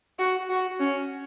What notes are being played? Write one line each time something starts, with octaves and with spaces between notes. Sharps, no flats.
F#4
F#4
C#4